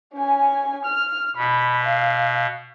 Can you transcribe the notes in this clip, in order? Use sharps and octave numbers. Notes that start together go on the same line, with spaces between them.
C#4 G#5
F6
B2 B5
F5